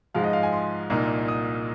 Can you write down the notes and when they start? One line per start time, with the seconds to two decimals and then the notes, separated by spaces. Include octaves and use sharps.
0.15 G#2 F3 G#3 F5
0.24 D#5
0.33 F5
0.43 G#5
0.53 C6
0.90 C2 A#2 A#3 D#4
1.28 D#6